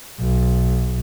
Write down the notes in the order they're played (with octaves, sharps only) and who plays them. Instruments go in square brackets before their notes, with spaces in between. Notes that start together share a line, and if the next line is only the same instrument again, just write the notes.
[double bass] B1